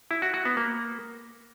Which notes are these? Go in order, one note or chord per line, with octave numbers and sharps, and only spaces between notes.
E4
F#4
F#4
B3
A#3